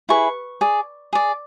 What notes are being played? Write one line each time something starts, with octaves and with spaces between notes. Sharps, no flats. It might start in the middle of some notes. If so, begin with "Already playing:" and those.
E4 G#4 B4 C#6
G#4 D5
G#4 D5